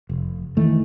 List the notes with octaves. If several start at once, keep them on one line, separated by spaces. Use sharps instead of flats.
F1
D#3 E3 A3